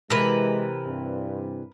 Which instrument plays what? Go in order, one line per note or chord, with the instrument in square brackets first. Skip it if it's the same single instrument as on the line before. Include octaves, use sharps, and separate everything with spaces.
[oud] C3 E3 [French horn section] G#3 [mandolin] A#4 B4
[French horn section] G2 C4